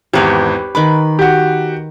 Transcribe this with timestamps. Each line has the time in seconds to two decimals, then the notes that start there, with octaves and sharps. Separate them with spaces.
0.13 G#1 E2 G4 B4 C#5
0.75 D#3 B4 B5 D6
1.19 F#4 G4